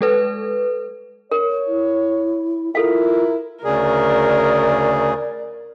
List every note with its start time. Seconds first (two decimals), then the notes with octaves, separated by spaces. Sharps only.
0.01 G#3 A4 B4
1.32 A#4 C#5
1.67 E4
2.75 E4 F4 A4 A#4 F5
3.64 D2 C#3 G#4 A#4 D5